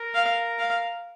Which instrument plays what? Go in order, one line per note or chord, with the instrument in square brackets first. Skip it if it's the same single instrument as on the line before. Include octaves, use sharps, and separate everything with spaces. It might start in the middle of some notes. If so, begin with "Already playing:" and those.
Already playing: [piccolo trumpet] A#4
[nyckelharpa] F5
F5